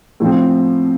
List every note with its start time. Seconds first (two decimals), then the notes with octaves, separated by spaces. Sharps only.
0.20 A2 F3 C4